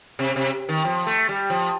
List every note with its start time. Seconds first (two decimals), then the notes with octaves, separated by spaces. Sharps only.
0.19 C3
0.36 C3
0.69 D#3
0.85 F3
1.07 A3
1.29 G3
1.50 F3